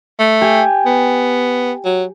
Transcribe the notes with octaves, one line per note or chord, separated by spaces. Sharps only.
A3
G4 G5 G#5
B3
F#3